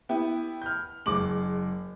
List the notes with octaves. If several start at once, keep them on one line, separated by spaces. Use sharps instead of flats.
B3 E4 G4
F6 G6
F#1 G#3 D6 F#7